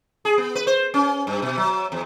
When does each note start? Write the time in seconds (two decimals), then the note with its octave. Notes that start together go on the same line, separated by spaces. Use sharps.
0.25 G#4
0.38 B3
0.55 B4
0.67 C5
0.94 C#4
1.27 G2
1.42 B2
1.58 F#3
1.92 E2